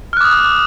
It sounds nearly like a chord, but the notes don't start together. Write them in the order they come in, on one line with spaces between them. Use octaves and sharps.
F6 F#6 D6 D#6